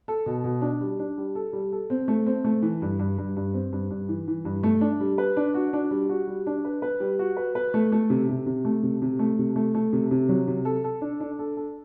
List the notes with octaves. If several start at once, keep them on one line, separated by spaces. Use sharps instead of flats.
A4
B2
B2
D4
G3
D4
G3
A4
G3
A4
C4
A3
C4
A3
E3
G2
G2
G2
G2
C4
G2
G2
E3
E3
G2
A3
D4
G3
B4
D4
F#4
D4
G3
F#4
G3
D4
B4
B4
G3
F#4
B4
B4
A3
A3
C3
C3
C3
A3
C3
C3
A3
C3
A3
A3
C3
C3
F#3
C3
A4
A4
D4
D4
A4
A4